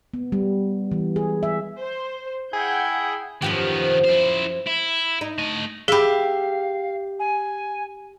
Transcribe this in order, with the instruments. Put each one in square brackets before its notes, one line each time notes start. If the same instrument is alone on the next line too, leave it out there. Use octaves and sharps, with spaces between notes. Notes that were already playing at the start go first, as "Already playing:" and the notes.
[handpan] B3
G3
E3
G#4
E5
[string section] C5
[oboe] E4 [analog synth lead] G#4 [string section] F#5 G5 G6
[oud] F#2 F3 G4 [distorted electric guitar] D#3 B3
[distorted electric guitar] E4 C5
E4
[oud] D#4
[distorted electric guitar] A3 D#5
[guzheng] G4 E5 [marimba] G#4 B5 [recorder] F5
[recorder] G#5